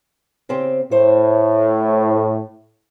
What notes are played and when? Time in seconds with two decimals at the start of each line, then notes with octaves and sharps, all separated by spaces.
0.49 C#3 C4 G4
0.91 A2 C5 C#5